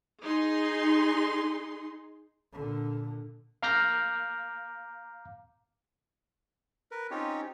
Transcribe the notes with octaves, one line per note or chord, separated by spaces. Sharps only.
D#4 G#4 C6
A#2 D3
F5 A#5 D6 F6 G6 A#6
A#4 B4
C4 C#4 D#4 F4 G4 C#5